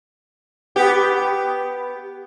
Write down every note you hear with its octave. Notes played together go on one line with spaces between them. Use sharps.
B3 G4